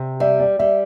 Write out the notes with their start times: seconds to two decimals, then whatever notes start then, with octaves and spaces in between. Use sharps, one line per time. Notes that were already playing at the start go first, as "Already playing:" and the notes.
Already playing: C3
0.20 G3 E5
0.40 D5
0.59 G3 E5